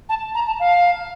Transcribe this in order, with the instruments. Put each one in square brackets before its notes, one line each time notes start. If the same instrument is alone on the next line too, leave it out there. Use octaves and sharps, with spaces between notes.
[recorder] A5
A#5
A5
F5